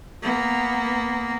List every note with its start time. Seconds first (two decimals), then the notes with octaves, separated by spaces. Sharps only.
0.22 A#3 B3